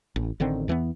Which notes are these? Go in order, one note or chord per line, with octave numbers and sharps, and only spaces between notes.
A1
A1 D3 D#3 C4
E2 E3 G#3 B3